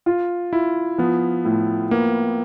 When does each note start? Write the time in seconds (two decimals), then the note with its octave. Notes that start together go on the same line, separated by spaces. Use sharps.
0.06 F4
0.53 E4 F4
0.98 F3 B3
1.45 A2
1.91 A#3 B3